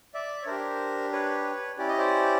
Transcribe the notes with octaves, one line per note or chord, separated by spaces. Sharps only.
D5 E5
C#5
D4 G4 A#4 C5
B4 C#5
C#4 E4 G4 D5
D#5
C5 D5